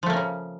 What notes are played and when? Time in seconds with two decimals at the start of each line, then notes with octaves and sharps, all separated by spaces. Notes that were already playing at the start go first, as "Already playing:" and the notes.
0.03 F3
0.06 A3
0.10 A#3
0.13 C#4
0.17 C#3